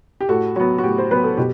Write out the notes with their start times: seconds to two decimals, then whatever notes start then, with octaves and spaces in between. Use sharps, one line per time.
0.21 G4
0.29 A2 F#4 A4
0.56 F#3 B3 F#4
0.78 F#4
0.83 A2 G4
0.98 C5
1.11 F#3 B3 B4
1.24 A4
1.37 B2 G4